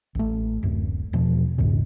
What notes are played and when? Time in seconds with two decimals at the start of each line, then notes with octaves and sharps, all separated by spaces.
0.15 A1 A3
0.63 D1 F#2
1.13 E2 B2 F3
1.58 A#1 E2 G#2 C#3